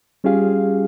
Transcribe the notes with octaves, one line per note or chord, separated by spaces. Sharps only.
G3 C#4 F4 G4 G#4 F5